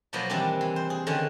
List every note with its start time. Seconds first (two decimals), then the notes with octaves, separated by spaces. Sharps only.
0.13 B2 F3 F#3 A#3 B3
0.30 C3 D#3 E3 G3 C4 D4
0.61 E3
0.76 C5
0.90 G#4
1.07 D3 D#3 F3 C#4